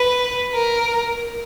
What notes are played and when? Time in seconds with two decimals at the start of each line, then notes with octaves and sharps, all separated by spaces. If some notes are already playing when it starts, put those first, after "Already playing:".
Already playing: B4
0.54 A#4